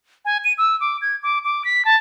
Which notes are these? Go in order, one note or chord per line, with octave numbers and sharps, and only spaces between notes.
G#5
D#7
E6
D6
G#6
D6
D6
B6
A5